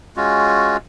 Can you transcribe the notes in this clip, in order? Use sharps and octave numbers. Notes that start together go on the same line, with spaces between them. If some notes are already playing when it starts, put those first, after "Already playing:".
G#3 C#4 F4 F#4